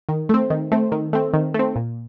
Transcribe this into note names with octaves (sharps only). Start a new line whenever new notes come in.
D#3
A3 C4
D#3
A3 C4
D#3
A3 C4
D#3
A3 C4
A#2